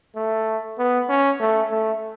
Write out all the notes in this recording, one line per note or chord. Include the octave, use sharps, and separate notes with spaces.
A3
B3
C#4
A3
A3